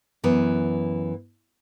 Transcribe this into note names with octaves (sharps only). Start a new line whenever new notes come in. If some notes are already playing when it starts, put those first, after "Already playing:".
F#2 E3 B3